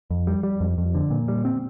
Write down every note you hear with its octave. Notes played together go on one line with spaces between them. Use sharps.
F2
G3
G3
F2
F2
D3
A#2
G3
C4